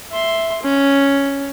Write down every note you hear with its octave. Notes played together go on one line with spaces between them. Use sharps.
E5 C6
C#4